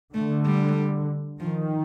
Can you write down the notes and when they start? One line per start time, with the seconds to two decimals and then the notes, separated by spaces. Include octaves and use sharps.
0.14 D3 A3
0.46 G3
1.40 D#3 F3